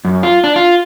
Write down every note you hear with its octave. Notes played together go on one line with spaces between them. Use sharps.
F#2
F4
D4
F4